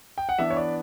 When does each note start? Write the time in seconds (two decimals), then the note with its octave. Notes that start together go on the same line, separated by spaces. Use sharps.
0.18 G5
0.29 F#5
0.39 E3 B3 D4 E5
0.50 C#5
0.57 D5